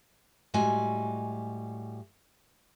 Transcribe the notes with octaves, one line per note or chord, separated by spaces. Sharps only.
A2 G3 G#3 F#4 G#5